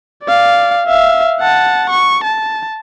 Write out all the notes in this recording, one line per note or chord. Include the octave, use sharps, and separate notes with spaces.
D5 F5
E5 F5
F#5 A5
C#6
A5